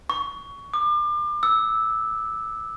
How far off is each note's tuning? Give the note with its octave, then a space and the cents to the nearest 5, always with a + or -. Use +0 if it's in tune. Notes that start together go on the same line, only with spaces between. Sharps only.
C#6 +20
D6 +35
E6 -10